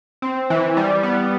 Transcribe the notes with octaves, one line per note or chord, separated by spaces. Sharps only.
C4
E3
G3
B3